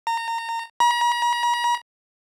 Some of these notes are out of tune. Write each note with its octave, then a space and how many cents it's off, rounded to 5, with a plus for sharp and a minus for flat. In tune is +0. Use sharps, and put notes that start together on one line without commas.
A#5 -25
A#5 +45